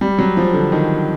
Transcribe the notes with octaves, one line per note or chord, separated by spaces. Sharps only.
G3
F#3
F3
D3
D#3